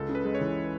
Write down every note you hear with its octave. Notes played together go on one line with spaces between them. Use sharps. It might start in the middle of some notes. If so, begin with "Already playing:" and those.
Already playing: C#2 A4
C#3
B4
G#3
C#5
E3